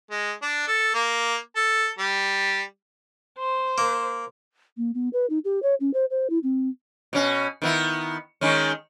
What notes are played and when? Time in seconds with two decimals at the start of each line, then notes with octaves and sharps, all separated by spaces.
0.11 G#3
0.42 D4
0.67 A4
0.94 A#3
1.56 A4
1.99 G3
3.39 C5
3.78 A#3
4.77 A#3
4.94 B3
5.13 B4
5.30 D#4
5.45 G4
5.63 C#5
5.80 C#4
5.94 C5
6.10 C5
6.30 E4
6.43 C4
7.13 B2 C#4
7.62 D#3 B3 E4
8.41 D#3 G#3 C#4